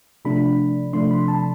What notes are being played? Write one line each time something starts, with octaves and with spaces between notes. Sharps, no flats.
C3 F3 A3 D4 B5
C3 F3 A3 D4 C6
B5
A5